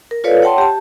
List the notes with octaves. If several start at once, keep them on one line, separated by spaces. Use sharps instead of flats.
A#4
F4 A4 B4 C#5 D5 F5
C#5 F#5 G5 A5 C6
G4 A5